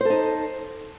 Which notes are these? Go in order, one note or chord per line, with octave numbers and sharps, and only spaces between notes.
D#4 A4 C5